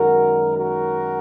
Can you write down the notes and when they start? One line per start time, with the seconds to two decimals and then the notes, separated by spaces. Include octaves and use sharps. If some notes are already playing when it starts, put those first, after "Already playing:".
Already playing: F#2 D#3 G#3 F#4 A#4
0.57 F#4 A#4